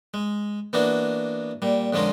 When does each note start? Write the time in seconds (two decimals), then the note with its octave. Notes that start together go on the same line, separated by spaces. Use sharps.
0.14 G#3
0.73 E3 A#3 B3 D4 F#4
1.62 A#2 G3
1.93 F2 D3 G#3 C#4 F4 A#4